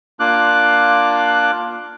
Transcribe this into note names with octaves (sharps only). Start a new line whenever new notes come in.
A#3 D4 F4 D6 F#6